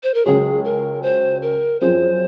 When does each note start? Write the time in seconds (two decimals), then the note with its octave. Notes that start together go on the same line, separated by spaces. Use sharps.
0.03 C5
0.14 A#4
0.25 C#2 C#3 F#3 C#4 G#4
0.65 A#4
1.03 C5
1.42 A#4
1.81 F#2 F3 C4 F4 G#4 C5